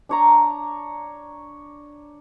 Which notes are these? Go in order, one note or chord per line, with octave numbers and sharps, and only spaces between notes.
D4 C#5 A#5